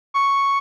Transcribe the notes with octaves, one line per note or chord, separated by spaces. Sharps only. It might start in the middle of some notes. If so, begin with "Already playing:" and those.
C#6